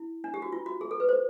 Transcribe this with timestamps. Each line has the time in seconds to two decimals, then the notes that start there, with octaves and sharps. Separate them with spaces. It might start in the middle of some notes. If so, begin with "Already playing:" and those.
Already playing: E4
0.24 D4
0.34 G4
0.42 F#4
0.52 F4
0.66 F#4
0.81 G#4
0.91 A4
1.00 B4
1.09 C5